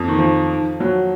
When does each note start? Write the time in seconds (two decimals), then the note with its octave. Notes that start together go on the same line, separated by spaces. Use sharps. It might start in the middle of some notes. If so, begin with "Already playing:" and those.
Already playing: F2
0.08 D#3
0.19 F3
0.80 F#3